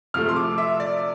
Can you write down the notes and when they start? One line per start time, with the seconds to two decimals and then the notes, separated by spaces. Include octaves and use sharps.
0.14 C3 F3 A3 F6
0.29 C6
0.36 D6
0.58 E5
0.80 D5